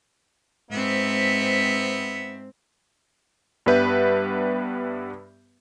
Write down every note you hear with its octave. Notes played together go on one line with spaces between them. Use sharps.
G#2 B3 C4 E5
G2 G3 B3 B4 E5 G6